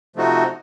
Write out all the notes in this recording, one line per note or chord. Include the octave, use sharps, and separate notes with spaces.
C3 F3 A3 D#4 F#4